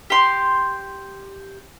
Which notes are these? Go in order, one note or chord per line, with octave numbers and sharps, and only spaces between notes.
G4 C6